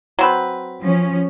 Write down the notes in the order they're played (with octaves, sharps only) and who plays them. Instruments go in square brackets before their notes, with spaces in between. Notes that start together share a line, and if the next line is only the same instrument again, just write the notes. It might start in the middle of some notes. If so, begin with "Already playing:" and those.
[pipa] F#3 C4 B4
[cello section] F3 C#4